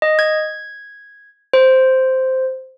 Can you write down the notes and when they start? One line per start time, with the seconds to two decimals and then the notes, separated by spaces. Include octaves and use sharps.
0.02 D#5
0.19 G#6
1.53 C5